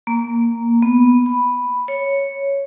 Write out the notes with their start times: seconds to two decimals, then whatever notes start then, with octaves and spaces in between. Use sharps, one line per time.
0.07 A#3
0.82 B3
1.26 B5
1.88 C#5